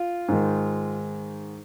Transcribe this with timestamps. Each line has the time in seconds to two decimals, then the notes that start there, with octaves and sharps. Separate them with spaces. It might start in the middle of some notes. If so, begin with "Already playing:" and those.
Already playing: F4
0.28 G#2 D#3